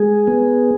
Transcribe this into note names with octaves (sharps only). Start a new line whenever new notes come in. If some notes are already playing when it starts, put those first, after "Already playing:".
Already playing: G#3 G#4
B3